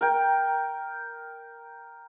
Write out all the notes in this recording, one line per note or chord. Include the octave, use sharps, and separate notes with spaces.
A#4 G5